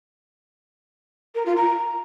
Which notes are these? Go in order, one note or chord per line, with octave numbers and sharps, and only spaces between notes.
A#4
F4
A#5